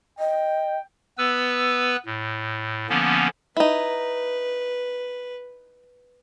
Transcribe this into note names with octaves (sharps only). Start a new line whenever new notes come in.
D#5 G5
B3 B4 E6
A2
D3 F3 A#3 B3 C#4
D#4 E4 B4